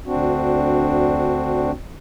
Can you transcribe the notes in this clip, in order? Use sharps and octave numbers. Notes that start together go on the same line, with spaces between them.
D2 C4 D4 F#4